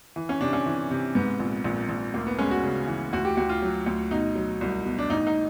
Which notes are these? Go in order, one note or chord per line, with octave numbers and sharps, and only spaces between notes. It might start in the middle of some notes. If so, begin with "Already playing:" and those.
E3
C#4
C3 D4
C#4
E3
C3
G#2 B3
A#1
A#1
A#1
D2 A#3
B3
G#3 C#4
F#4
C#3
E3
D2 F#4
G4
D2 F#4
F4
F#3
D2
B2 D#4
F#3
C2
B2
D4
A1 D#4
D#4